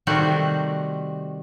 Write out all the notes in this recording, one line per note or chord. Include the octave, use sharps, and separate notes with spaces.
C3 D#3 G3 A3 F#4 C5